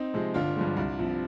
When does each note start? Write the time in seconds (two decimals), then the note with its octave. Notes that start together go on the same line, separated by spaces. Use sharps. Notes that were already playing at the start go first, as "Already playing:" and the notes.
Already playing: C4 D#4
0.14 C3 F3 G#3
0.34 G1 D4 F4
0.56 G2 F3 G#3
0.77 C2
0.99 C3 F3